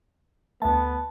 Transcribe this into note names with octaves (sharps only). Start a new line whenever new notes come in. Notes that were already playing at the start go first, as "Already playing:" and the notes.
D2 A3 B3 A5